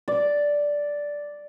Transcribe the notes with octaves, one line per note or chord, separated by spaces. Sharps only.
D5